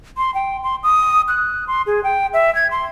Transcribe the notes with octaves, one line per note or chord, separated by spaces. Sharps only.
C6
G5
C6
D#6
F#6
C6
G#4
G5
E5
G#6
C6